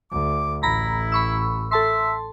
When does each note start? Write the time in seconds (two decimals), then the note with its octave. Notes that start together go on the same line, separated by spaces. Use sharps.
0.12 D2 D6
0.63 A1 E4 A#5 B5 A#6
1.12 B5 C#6 E6
1.71 A4 E5 A5 C6